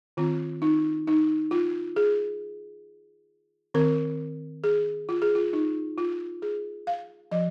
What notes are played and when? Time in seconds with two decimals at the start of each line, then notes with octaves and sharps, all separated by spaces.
0.17 D#3 C4 F4
0.62 D#4
1.07 D#4
1.51 F4
1.96 G#4
3.74 D#3 C4 A#4
4.64 G#4
5.09 F4
5.22 G#4
5.35 F4
5.53 D#4
5.98 F4
6.42 G#4
6.87 F5
7.31 F3 D#5